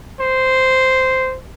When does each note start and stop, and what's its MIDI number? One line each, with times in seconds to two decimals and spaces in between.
0.20 1.36 72